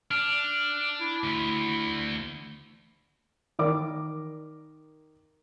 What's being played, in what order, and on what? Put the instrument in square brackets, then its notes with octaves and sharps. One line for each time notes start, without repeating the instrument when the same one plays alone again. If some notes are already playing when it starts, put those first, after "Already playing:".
[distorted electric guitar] D4 [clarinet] F6
[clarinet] E4
[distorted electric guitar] D2
[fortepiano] D#3 A#4 D5 D6